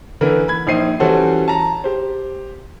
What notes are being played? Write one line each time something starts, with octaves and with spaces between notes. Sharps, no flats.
D3 E3 A#4 B4
B5 G#6
A#1 D#4 C5 C7 D#7
E3 G3 C#4 F#4 A4 C5
A5 A#5
G4 C5